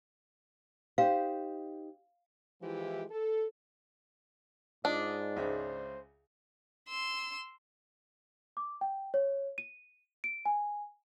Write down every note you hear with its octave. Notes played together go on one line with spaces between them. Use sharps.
D#4 G4 C5 F5
E3 F3 G#3 E4 F4 G4
A4
G#2 D4 F4 D#5
C#2 C#3 C5 E5
C6 E6
D6
G5
C#5
D#7
D7
G#5